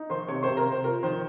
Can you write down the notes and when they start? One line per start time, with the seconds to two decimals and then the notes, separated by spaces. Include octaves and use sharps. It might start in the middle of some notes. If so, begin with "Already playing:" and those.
Already playing: D#4
0.10 D#3 C5 C6
0.28 C3 C#5 C#6
0.43 C5 C6
0.48 C3
0.57 A#4 A#5
0.66 C3
0.71 C5
0.84 F4 A#4
1.03 D#3 C5